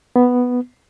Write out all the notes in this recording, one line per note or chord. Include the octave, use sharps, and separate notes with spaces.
B3